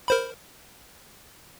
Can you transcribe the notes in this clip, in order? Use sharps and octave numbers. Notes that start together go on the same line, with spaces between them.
A#4 C5 B5